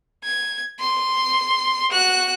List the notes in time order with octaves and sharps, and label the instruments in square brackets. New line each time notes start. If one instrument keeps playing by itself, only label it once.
[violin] G#6
C6
F#4 F#6